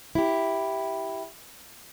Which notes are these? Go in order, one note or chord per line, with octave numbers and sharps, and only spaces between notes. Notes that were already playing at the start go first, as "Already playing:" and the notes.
E4 G4